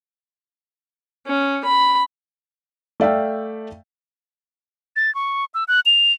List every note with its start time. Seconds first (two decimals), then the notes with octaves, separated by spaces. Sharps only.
1.27 C#4
1.65 B5
3.00 A3 D5 E5 F5 G5
4.96 A6
5.15 C#6
5.54 E6
5.68 F#6
5.86 F7